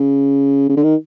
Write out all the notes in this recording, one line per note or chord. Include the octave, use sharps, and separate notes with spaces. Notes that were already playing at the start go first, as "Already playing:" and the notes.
Already playing: C#3
C#3
D3
D#3